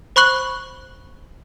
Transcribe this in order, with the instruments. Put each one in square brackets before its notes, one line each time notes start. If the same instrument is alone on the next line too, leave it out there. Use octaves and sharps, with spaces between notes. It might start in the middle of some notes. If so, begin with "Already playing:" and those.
[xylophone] C5 B5 C#6 F#6 F#7